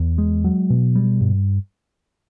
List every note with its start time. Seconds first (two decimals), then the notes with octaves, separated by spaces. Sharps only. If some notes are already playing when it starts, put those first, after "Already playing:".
Already playing: E2
0.18 G#3
0.44 F#3
0.70 B2
0.95 G3
1.21 G2